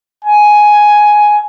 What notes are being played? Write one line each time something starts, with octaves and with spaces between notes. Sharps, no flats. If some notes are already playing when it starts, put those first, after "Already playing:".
G#5